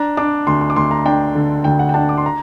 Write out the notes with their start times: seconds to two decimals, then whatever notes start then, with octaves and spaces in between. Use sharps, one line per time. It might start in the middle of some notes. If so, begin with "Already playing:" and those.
Already playing: D4 A#5
0.17 D4 D6
0.47 D2 C6
0.61 C6
0.70 D6
0.76 D2 C6
0.91 A#5
1.05 D4 G5
1.35 D3
1.64 D2 G5
1.79 F#5
1.89 G5
1.94 D4 A5
2.09 D6
2.18 C6
2.26 A#5